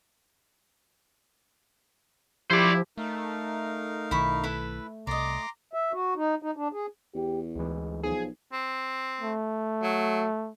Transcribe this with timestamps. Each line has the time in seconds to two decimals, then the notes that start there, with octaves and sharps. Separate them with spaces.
2.50 F3 E4 G4 C5 D5
2.98 A3 D#4 A#4 F5
4.11 B1 D#3 E4 B5 C#6
4.44 E4 A4 B4
5.07 C2 D5 D#5 A#5 C6 D6
5.73 E5
5.92 F#4
6.16 D#4
6.42 D#4
6.56 D4
6.73 G#4
7.15 E2 G4
7.56 D2 E3 G#3
8.03 B1 F3 G#4
8.53 C4
9.21 A3
9.82 F#3